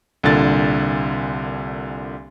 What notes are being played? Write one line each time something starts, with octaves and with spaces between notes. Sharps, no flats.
C2 A#2 D3 A6